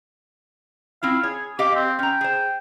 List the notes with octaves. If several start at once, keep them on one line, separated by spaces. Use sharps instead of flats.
C4 E4 F4 F5
G#4 C#5
G4 D#5 F5 D6
C4
C#4 G5 A#5
G#4 C5